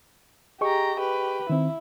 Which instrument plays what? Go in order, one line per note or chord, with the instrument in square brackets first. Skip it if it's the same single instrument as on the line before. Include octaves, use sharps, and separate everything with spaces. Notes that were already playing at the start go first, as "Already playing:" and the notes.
[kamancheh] G4 A#5 [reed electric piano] G#4 D#5 C#6
[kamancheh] G4 B4
[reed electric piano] D#3 C4 [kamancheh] E4